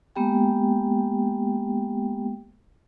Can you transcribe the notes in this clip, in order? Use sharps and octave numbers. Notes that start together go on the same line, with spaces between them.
G#3 A#3 B3 G4 G5